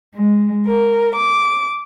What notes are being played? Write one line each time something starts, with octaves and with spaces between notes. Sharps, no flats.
G#3
A#4
D6